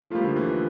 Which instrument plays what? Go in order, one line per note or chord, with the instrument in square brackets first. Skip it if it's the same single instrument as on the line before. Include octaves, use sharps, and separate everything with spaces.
[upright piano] F3 A3 [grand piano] G3 A#3 F4
[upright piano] D3 F3
E3
E3